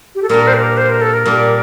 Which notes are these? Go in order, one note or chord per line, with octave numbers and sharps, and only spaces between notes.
G4
A4
A#2 G3 D4 A#4
C5
A#4
C5
A#4
A4
A#4
A#2 G3 D4